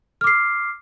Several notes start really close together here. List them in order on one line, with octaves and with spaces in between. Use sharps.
F6 D6 C7